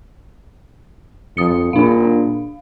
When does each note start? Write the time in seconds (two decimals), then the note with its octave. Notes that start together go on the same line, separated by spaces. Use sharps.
1.37 F2 D#6 C#7
1.73 A#2 D4 F5